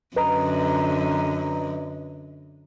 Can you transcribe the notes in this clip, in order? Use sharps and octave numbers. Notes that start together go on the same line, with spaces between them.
F#2 D3 B4 D#5 A#5